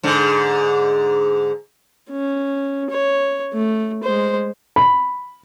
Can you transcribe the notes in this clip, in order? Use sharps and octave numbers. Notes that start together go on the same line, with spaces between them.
G#2 D3
C#4
C#5
A3
G#3 C5
B5